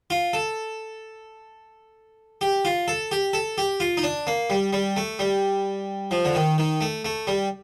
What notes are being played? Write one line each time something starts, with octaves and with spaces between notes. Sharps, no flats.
F4
A4
G4
F4
A4
G4
A4
G4
F4
D#4
D4
A#3
G3
G3
A3
G3
F3
D3
D#3
D#3
A3
A3
G3